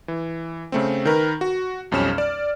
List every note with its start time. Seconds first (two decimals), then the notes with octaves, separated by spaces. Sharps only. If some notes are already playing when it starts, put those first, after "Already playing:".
0.08 E3
0.72 C#3 A3 C4
1.05 D#3 A#4 B4
1.41 F#4
1.91 B1 F2 G3 C#4 F6 E7
2.18 D5